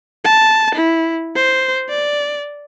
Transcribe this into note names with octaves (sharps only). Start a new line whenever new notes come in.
A5
E4
C5
D5